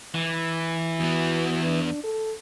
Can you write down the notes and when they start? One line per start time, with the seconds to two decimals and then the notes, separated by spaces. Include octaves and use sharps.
0.14 E3
1.00 E2 B3 F#4
1.65 D4
2.04 A4